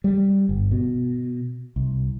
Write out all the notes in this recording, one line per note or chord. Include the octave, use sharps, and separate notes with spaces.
G3
G1
B2
C2